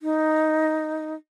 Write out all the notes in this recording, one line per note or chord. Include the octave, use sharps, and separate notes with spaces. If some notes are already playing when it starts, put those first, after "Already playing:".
D#4